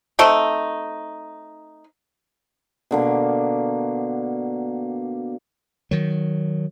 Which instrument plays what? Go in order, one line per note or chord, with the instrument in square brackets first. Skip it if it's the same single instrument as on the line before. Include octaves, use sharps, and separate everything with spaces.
[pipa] A3 C4 D#4
[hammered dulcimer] B2 D3 A#3
[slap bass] D#3 F#3